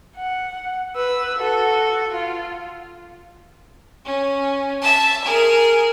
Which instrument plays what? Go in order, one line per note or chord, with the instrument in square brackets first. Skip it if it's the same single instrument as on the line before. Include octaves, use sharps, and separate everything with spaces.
[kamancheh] F#5
B4 E6
F#4 A4
F4
[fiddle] C#4
E5 A5
G#4 A#4